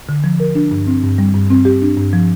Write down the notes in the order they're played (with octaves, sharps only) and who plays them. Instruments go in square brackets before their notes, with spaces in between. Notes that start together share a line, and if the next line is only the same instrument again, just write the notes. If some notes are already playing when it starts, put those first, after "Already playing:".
[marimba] D3
F3
A#4
D4
G2
C4
G2
G3
G2
C4
G4
D4
G2
F3